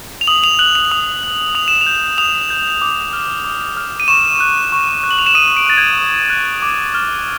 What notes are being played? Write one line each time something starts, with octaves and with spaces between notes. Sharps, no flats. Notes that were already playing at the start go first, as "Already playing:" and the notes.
F7
D#6 F#7
F7
F#6 F#7
F7
D#6 F7
F#6
D#6 F7
E7
F7
G6
D#6 F7
G6
D6
F6
D6
F6
D#7
C#6 E7
F#6
C#6
F#6
F#7
F7
E7
D#6 D#7
D7
F#6 A6
G#6
D#6
F#6
D6
F6